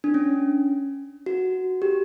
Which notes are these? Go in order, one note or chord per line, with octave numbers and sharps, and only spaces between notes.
D4
C#4
F#4
G4